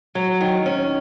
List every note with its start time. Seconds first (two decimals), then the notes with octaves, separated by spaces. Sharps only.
0.15 F#3
0.41 D#3
0.66 C#4